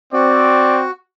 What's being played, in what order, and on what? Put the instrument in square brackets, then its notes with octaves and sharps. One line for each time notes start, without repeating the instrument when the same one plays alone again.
[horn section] C4 [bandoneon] F#4 [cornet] D5